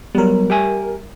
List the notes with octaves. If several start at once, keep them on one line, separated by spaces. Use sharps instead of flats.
F#3 G3 B3 A#4
G4 E5 G#5